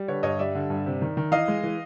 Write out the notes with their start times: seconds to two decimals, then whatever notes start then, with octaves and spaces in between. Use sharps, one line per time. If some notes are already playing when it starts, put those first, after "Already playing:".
Already playing: G3
0.08 D3 B4 C#5
0.23 G2 C#5 D#5
0.39 G3 D5 E5
0.55 D3
0.70 G2
0.86 C3
1.02 D#3
1.17 D#3
1.31 E3 D#5 F5
1.48 G#3
1.63 E3